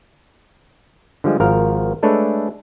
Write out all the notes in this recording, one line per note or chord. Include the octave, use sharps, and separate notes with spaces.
D3 F3 G3 G#3
G#1 F3 A#4 F5
G#3 A3 D4 A4 B4 C#5